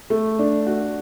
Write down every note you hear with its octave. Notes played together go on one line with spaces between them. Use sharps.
A3
D4
F#4